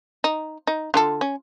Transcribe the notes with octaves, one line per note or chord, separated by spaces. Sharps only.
D#4
D#4
D3 F4 A4
C#4